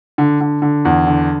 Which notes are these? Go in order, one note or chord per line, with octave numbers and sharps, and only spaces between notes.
D3
D3
D3
E2
D3